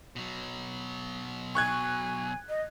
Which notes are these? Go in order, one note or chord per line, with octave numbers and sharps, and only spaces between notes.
B2 F#3
G#5 C#6 F#6 G#6
D#5